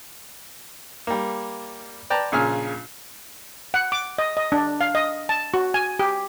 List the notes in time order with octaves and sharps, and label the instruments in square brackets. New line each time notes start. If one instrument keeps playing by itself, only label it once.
[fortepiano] G3 A#3
B4 D5 G5 A5 A#5
A#1 A#2 C#3 G#5 F6
[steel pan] F#5
D6
D#5
D#5
D4
F5
D#5
A5
F#4
G#5
G4